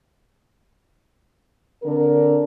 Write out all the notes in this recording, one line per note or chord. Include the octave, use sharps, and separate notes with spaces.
D3 C4 D4 A#4